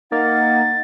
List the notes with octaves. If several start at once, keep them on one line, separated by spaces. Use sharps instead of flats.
A#3 D#4 F#5 A6